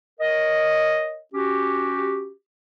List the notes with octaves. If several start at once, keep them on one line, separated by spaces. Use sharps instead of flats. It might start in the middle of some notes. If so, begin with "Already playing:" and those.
A#4 C#5 D#5
C#4 F#4 G4